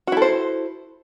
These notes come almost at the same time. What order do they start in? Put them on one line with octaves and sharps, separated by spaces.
F#4 E4 A4 C5